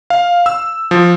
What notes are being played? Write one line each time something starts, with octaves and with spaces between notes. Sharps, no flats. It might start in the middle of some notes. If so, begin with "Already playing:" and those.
F5
E6
F3